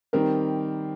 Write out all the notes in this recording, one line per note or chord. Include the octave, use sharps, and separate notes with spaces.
D#3 G3 C4 G4 A#4